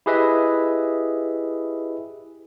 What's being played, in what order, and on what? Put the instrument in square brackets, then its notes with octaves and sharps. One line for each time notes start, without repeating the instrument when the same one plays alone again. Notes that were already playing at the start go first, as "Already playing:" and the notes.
[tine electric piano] E4 G4 G#4 B4 D#5 E5